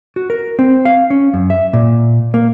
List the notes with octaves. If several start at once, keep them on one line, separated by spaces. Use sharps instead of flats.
F#4
A#4
C4
F5
C#4
F#2
E5
A#2
A#3